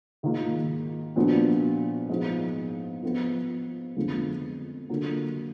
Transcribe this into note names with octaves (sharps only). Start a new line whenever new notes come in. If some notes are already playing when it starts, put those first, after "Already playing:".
G#2 D#3 A#3 F4
A#2 F3 B3 D4 F#4
G#2 F3 B3
F3 B3 F4
F2 D3 G#3 B3 F4
D3 F#3 A#3 F4